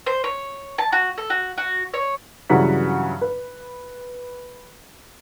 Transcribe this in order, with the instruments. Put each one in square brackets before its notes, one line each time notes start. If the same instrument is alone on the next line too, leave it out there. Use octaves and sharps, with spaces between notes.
[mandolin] C5
C#5
A5
F#4
A4
F#4
F#4
C#5
[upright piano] G2 C#3 E3 F#3 F#5 B6
B4